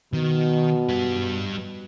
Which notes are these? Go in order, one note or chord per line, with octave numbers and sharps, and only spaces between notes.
B2 D#3
G3 B4